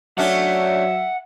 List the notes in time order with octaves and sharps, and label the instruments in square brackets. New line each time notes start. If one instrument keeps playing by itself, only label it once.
[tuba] F#3 [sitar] A3 C#4 D4 [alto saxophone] E5 [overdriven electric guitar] F#5